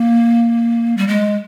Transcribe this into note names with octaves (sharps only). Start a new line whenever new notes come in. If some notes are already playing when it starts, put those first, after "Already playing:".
Already playing: A#3
G3
G#3